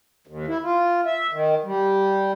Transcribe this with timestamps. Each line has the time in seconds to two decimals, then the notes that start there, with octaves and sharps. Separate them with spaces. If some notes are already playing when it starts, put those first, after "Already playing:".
0.27 D#2
0.48 E4
0.64 F4
1.06 E5
1.32 D#3
1.64 G3